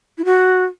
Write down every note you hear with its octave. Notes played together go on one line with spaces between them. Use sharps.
E4
F#4